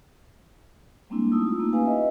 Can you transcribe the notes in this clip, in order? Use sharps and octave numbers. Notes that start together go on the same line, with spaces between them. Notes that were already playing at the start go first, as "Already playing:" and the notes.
G3 G#3 A#3 C4 D4 E4
A3 D#4 E4 D#6 E6
F4
A3 A#3 D#4
C#4 E4 G4 B4 F5 G#5
B4 D#5 E5